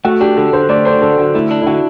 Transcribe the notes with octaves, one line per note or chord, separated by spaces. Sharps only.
A3 F#4
D4 G4
D3 A4
D3 C5
A3 D5
D4 C5
D3 A4
D3 F#4
A3 E4
D4
E4
D3 F#4